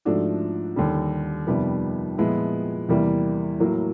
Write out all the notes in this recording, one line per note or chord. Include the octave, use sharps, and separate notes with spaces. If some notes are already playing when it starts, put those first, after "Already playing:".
G#2 F3 A3 D4 F#4
D#2 D3 G3
F2 C3 D#3 G3 B3
A#2 F3 G#3 B3 E4
E2 C3 E3 G3 A#3
A2 F#3 A#3